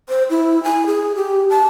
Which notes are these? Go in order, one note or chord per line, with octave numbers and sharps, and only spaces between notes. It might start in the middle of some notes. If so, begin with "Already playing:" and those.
C5
E4
G#5
G#4
G4
A5